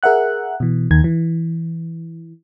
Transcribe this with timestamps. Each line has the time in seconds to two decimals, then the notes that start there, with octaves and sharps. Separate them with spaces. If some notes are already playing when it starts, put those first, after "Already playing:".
0.03 G#4 A#4 E5 F#5 F#6
0.60 B2 E3
0.91 D#2 D#3 G#6
1.04 E3